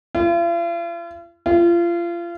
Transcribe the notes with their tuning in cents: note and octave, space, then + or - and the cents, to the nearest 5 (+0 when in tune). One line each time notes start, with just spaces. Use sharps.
F4 -45
F4 -30